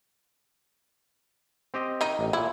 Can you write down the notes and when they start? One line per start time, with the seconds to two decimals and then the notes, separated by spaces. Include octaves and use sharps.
1.74 C4 G4 D#5
2.01 D#3 D#4
2.19 A1
2.33 A#2 E4